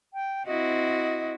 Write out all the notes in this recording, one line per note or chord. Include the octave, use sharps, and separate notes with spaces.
G5
C4 E4 F#4 D#5